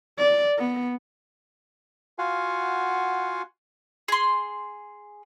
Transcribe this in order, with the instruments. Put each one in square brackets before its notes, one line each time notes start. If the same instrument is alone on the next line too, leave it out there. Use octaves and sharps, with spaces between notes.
[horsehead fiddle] D5
B3
[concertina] F4 F#4 F5 F#5 G#5
[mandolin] G#4 C6